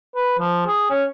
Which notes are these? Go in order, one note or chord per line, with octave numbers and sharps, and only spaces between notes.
B4
F3
G#4
C#4